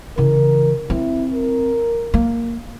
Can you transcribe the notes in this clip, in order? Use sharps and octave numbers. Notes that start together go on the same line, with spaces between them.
C#3 E3 A#4
C4 E4
A#4
A#3